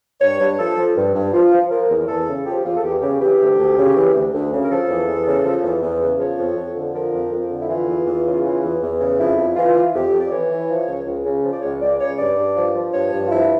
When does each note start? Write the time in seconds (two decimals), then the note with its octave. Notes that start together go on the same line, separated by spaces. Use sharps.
0.21 G2 C#5
0.40 G2
0.59 F3 A4
0.78 F3
0.97 G2
1.15 G2
1.33 F3 F4
1.53 F3
1.71 F3 A#4
1.90 E2
2.08 E2 A4
2.28 C#3
2.46 F3 G4
2.64 E2 F4
2.77 A4
2.83 E2 G4
3.02 C#3 G4
3.21 E3 G4
3.40 D2
3.59 D2
3.77 C#3
3.96 E3
4.15 D2
4.34 D2
4.52 C#3
4.64 A#4
4.71 F3 A4
4.90 E2
5.08 E2
5.26 C#3
5.45 F3
5.64 E2
5.82 E2
6.02 C#3
6.20 F3 C#5
6.38 F2
6.57 F2
6.76 D3
6.95 F3 A#4
7.14 F2
7.32 F2
7.51 D3
7.62 E4
7.70 E3 F4
7.88 E2
8.07 E2
8.26 C#3
8.45 E3
8.64 E2
8.83 E2
9.01 C#3
9.20 F2 E4
9.38 F2
9.56 E3 F4
9.76 E3
9.95 F2 G4
10.13 F2
10.21 D5
10.31 E3 C#5
10.51 E3
10.69 F3
10.88 C#2
11.07 C#2
11.25 C#3
11.44 F3
11.53 D5
11.62 C#2 C#5
11.81 C#2 D5
12.00 C#3 C#5
12.19 G2 D5
12.37 G2
12.56 F3
12.75 F3
12.94 G2 C#5
13.12 G2
13.26 F4
13.31 F3 E4